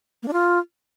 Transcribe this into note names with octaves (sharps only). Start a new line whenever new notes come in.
A#3
D4
F4